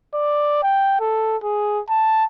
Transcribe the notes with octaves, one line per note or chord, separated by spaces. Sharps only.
D5
G5
A4
G#4
A5